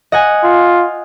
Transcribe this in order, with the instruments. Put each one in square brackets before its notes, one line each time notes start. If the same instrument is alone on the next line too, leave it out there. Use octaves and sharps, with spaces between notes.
[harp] D#5 F#5 G#5
[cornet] F4